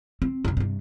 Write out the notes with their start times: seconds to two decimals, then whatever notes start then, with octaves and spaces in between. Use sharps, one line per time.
0.22 C4
0.45 F#2 C3
0.57 G2 C3